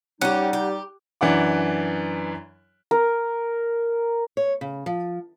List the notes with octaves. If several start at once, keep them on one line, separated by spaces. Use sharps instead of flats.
G3 C#4 D#4 G4 F#5
G4
F#2 E3 D4 F#5 D6
A#4
C#5
C#3
F3